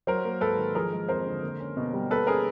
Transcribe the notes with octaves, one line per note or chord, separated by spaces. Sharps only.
F#3 A#4 C5
A#3
G#2 A4 B4
D#3
F3 G#4 A#4
G#3
F2 A#4 C5
D3
A#3
C#4
B2
G3
A#3 A4 B4
C#4 G#4 A#4